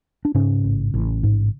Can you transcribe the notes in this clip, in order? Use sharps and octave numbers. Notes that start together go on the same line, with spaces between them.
D4
G#2 C#3 C#4
A1
A1
G#2